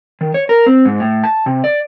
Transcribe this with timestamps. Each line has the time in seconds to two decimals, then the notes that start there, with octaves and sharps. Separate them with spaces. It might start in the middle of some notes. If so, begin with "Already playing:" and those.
0.21 D#3
0.34 C#5
0.49 A#4
0.66 C4
0.85 G#2
1.00 A2
1.24 A5
1.46 C3
1.64 D5